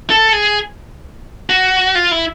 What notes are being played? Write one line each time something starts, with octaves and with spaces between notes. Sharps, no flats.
A4
G#4
F#4
F4
E4